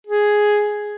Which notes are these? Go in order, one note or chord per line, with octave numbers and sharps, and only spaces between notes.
G#4